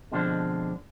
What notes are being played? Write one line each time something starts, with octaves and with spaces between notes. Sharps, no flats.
B2 D3 F3 G#3 C4 D4